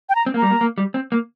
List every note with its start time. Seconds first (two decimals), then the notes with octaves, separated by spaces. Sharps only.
0.09 G5
0.15 A#5
0.26 C4
0.34 A#3
0.38 G3 A#5
0.50 A#3
0.61 A#3
0.78 G3
0.94 C4
1.12 A#3